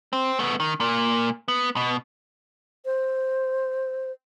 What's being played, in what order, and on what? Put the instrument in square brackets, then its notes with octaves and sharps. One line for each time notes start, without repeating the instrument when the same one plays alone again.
[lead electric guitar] C4
A3 B3
D#3
A#2 A#3
B3
B2
[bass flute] C5